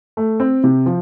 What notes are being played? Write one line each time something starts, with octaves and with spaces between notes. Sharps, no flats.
A3
C4
C3
F3